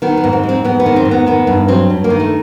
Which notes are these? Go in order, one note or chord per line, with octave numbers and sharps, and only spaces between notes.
D#3 B3
B3
G#2
C4
G#3
C4
G#2 B3
B3
D#3
C4
G#2
B3
D#3 B3
G2 B3
F#3 C4
G2
A#3
D#3
A3